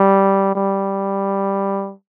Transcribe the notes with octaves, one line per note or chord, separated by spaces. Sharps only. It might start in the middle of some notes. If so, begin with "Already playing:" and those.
Already playing: G3
G3